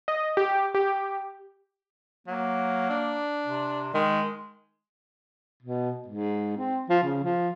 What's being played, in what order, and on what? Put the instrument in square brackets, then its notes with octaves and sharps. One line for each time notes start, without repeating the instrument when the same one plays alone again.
[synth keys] D#5
G4
G4
[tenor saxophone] F#3 [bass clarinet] A#3
[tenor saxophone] D4
[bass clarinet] C3
[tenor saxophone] D#3 [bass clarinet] G#3
[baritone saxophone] B2
G#2
C4
F3
C#3
F3